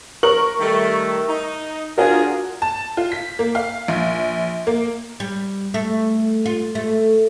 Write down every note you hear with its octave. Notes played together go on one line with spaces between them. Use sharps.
A#4 C#6 F#7
D#3 G3 A3
D#4
D4 F4 F#4 G#4 A#4
A5
F4
B6
A#3
F5
A#1
A#3
G3
A3
F4
A3